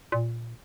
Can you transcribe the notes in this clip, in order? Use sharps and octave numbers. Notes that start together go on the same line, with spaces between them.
A#2